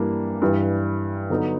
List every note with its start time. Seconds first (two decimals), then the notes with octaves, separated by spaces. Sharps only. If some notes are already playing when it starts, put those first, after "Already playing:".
Already playing: G2 E3 G3 A#3 D4
0.42 G2 E3 G3
1.29 D3 F#3 B3 D#4